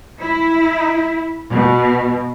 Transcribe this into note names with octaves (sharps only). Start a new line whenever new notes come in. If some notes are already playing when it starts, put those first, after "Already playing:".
E4
B2